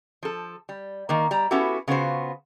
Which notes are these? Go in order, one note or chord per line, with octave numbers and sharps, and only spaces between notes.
F3 A4
G3
D#3 A#3
G3 A#5
B3 C#4 E4 F#4 G4 A4
C#3 B3 F4 F#4 C5